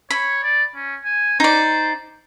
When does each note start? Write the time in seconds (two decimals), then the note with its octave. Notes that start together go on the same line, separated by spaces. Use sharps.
0.10 C#5 B5
0.43 D5
0.75 C#4
1.05 G#5
1.40 D#4 C5 D5